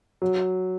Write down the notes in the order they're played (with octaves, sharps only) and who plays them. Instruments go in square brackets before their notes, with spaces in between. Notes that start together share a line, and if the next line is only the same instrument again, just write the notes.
[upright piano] F#3